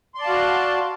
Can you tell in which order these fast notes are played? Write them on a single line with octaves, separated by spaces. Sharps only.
C6 D5 A5 F5 F#4